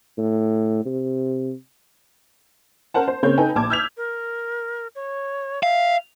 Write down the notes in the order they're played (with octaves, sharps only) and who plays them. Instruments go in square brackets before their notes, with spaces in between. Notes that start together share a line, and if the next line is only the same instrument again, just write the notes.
[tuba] A2
C3
[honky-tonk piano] C#4 A#4 C5 F#5 A5
C5
C#3 A#3 C4 C#5 G6
D#4 A4 B4 G5 G#5
A#1 A5 D6 G#6
E6 F6 G6 G#6 B6 F7
[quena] A#4
C#5
[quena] E5 [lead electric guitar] F5